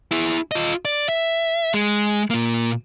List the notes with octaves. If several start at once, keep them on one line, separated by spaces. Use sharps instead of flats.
E4 G#4
F4 D#5
D5
E5
G#3
A#2 A#3